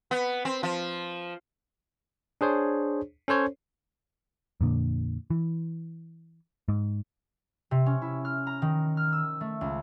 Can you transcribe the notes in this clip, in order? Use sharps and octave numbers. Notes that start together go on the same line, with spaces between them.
B3
C4
F3
D4 G#4 C5 C#5
C#4 A4 C5 C#5
F2 A#2 D3
E3
G#2
C3
C#4
E4
F6
A#5
D#3
F6
E6
A3
C#2